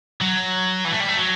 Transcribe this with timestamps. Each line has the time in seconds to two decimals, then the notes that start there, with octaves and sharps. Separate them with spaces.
0.21 F#3
0.85 E3
0.92 A3
1.00 G3
1.09 A3
1.17 F#3